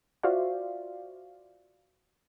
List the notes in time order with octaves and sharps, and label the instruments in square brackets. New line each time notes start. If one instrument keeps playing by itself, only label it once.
[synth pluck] F4 F#4 C5 D5 E5 F5